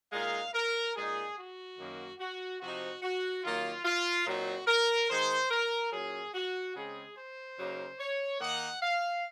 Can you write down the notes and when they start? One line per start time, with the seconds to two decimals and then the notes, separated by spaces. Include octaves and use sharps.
0.12 A#2 G#3 D#4 F5
0.54 A#4
0.95 A#2 G#3 D#4 G#4
1.37 F#4
1.79 F#2 D#3 A#3
2.20 F#4
2.61 C3 F3 C4 D#4 F#4
3.03 F#4
3.44 D#3 F#3 A#3 F4
3.85 F4
4.26 A#2 F#3 C4 D#4 F#4
4.68 A#4
5.09 D#3 G#3 D#4 C5
5.51 A#4
5.92 A#2 F#3 C#4 G#4
6.34 F#4
6.75 C#3 G#3 C4 G#4
7.17 C5
7.58 C#3 F#3 A#3 D#4
7.99 C#5
8.41 D#3 A#3 D#4 F#5
8.82 F5